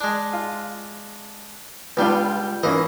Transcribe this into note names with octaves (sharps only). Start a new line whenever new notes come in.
G#3 D4
F4
C#2 G3 B3 D4 F4 C6
E3 A#3 C#4 D#5